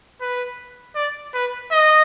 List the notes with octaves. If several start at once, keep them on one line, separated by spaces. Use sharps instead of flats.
B4
D5
B4
D#5